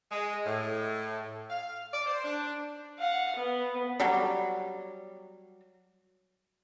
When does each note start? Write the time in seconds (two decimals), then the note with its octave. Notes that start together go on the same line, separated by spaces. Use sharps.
0.11 G#3
0.46 A2
1.50 F5
1.94 D5
2.06 C5
2.25 D4
2.99 F5 F#5
3.36 B3
4.00 F#3 G3